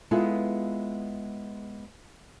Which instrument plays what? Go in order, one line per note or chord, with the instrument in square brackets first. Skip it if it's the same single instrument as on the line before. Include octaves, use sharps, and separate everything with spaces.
[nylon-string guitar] G#3 B3 E4 F4 G#4 A4